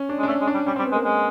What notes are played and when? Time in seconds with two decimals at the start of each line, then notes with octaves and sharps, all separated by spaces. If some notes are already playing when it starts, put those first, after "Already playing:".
Already playing: C#4
0.09 D4
0.18 G#3
0.23 D4
0.28 A3 C#4
0.41 G#3
0.47 D4
0.54 G3
0.66 G3 C#4
0.76 C4
0.79 G3
0.86 B3
0.92 G#3
0.95 A#3
1.04 G#3